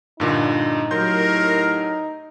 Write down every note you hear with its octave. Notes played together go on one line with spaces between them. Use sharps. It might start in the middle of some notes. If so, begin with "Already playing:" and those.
G2 A#2 D3 D#4
A2 F#3 G4 A#4 C6 G6